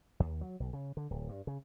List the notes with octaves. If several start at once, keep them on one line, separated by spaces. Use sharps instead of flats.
D#2
F#3
B1
C#3
D3
D1
G2
C#3